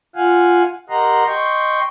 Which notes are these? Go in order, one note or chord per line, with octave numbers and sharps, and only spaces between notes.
F4 F5 F#5 G#5
G4 A#4 D#5 F#5 A#5 C6
D#5 G5 C6 C#6